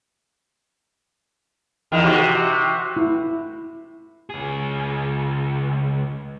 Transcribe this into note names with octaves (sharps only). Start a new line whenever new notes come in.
E2 D#3
C3 F#4
E4
C#2 G#4